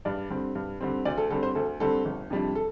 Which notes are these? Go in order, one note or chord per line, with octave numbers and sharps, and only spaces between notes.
G2 D5
D3 G3 C4
G2
D3 G3 C4
D2 D5
A4
D3 G3 C4 A4
C5
D2 A4
D3 G3 C4 A4
G1
F2 C3 G3 D4
A4